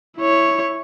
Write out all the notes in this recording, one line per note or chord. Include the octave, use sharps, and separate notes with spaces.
E4 C#5